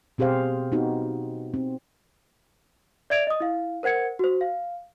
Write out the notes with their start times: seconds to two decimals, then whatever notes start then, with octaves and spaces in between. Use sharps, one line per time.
0.18 B2 C4 G4 G#4 C5 F5
0.72 B3 C4 D#4 F#4 G4
1.54 C4
3.10 D5 E5 G#6 D7 F7
3.27 D#5 D#6
3.40 E4 F5
3.83 A#4 C5 F#5 G#6 C#7
4.19 F#4 C5
4.41 F5